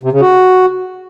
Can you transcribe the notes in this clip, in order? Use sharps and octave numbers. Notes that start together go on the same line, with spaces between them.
C3
C#3
F#4